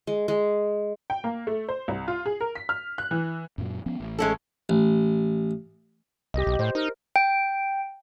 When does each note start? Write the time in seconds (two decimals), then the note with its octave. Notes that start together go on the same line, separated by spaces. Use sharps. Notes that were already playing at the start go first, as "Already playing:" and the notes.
0.07 G#3
0.28 G#3
1.10 G5
1.24 A#3
1.47 A3
1.69 C5
1.88 C2
2.08 F4
2.26 G#4
2.41 A#4
2.55 B6
2.69 F6
2.98 F#6
3.11 E3
3.58 F#2 A#2 F#3
3.86 F3 B3 C#4
4.00 A1
4.19 G#3 C#4 A4
4.69 A1
6.34 C2 G4 D#5
6.47 B1
6.59 A2 C5
6.75 D#4 A#4
7.16 G5